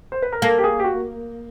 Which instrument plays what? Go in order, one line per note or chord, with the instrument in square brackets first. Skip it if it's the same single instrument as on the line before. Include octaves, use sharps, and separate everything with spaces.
[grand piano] C5
B4
A#4
[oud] A#3 [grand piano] A4
[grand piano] G4
G#4
G4
F#4